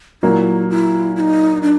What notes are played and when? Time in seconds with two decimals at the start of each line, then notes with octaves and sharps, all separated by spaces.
0.23 A#2 F#3 A#3 E4
0.70 E4
1.16 E4
1.20 D#4
1.63 D4